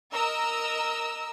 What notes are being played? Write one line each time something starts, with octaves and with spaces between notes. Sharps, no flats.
A#4 D#5 A#5 E6